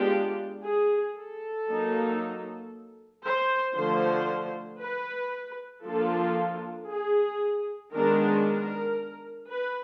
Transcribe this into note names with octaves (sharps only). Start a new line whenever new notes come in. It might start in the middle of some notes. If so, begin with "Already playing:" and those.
Already playing: G#3 B3 D4 F4 G4
G#4
A4
F#3 A#3 D#4
C5
D3 F3 A3 C5
B4
F3 A#3 D4 F4 A4
G#4
D#3 G#3 B3 D4 A#4
A#4
B4